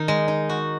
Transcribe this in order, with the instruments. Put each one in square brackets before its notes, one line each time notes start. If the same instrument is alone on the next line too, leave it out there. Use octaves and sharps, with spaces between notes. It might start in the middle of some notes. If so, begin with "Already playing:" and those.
Already playing: [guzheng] D#3 D#4
G#3
D#4
F#4